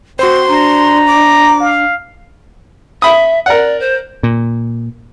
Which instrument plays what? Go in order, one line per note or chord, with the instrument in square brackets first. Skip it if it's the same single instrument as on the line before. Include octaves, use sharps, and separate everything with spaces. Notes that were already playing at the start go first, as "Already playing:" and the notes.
[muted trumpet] C4 [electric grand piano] F#4 C5 [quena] C6
[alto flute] D4 [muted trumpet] A#5
[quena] D6
[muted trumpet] F5
[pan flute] E5 [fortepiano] B5 D#6
[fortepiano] A#4 F#5 [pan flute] D5
[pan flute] C5
[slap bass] A#2